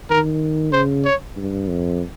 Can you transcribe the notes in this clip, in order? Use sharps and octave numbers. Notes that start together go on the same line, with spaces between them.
D#3 A#4
C#3 C5
C#5
G2
F2